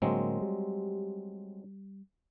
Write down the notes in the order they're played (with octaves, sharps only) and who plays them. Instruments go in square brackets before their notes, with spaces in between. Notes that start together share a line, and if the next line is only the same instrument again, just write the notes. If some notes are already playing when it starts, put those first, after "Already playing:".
[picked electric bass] A2 D3 A#3 [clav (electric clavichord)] F#3 G#3 C4
[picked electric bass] G3